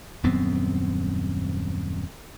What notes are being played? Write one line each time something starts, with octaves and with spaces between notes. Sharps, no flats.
D#1 F#2 B3 C4